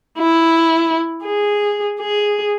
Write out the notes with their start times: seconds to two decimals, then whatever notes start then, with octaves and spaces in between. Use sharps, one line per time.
0.18 E4
1.24 G#4
2.00 G#4